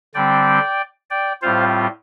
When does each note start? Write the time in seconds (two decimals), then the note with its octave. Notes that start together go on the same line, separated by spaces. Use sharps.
0.15 D3 G3 C4 D5 G5
1.10 D5 G5
1.42 A2 G3 C4 F4 C5 F5